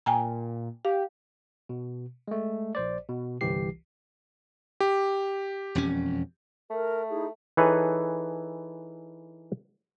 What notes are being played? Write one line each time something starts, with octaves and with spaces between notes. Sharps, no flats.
A#2 G5 G#5 A#5
G4 F5
B2
G#3 A3
A#1 C5 D5
B2
G1 C2 E3 G4 C7
G4
E1 F2 C#4
A3 A#4
D#4 E4 G#4
E3 D#4 G#4 A4 B4 C#5